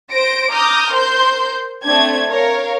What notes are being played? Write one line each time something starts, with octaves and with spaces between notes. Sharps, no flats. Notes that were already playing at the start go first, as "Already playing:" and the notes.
C5 A#6 D7
A#5 D6 D#6 F6 G6
A#4 C5 C6 G6
A3 C4 D4 G#6
A#4 C#5 F5